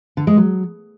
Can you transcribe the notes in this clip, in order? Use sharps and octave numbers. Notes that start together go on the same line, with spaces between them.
D3
G#3
F#3